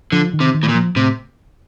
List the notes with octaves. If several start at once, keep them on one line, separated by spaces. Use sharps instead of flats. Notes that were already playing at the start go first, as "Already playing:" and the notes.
D3 F3
D#3
C3
D#3
A2
A#2
F3
A2 C3